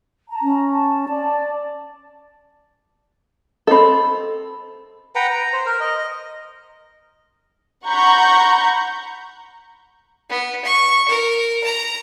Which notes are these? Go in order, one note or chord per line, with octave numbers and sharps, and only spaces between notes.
A5 A#5
C#4
A5
D5
C4 A4 D#5 B5
B4 F#5 G5 A#5
A#5
C5
A#4
D#5
D#5
F#5 A#5 B5 C#6 G6
B3
C#6
A#4
A#5